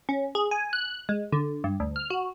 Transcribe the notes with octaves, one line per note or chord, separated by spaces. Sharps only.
C#4
G#4
G#5
F#6
G#3
D3
G2
D2
F6
F#4